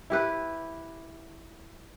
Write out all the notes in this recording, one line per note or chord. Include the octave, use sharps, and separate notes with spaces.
E4 G4 B4